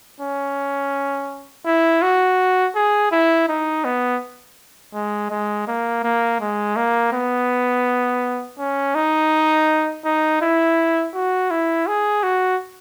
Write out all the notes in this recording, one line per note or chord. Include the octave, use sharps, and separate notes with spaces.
C#4
E4
F#4
G#4
E4
D#4
B3
G#3
G#3
A#3
A#3
G#3
A#3
B3
C#4
D#4
D#4
E4
F#4
E4
G#4
F#4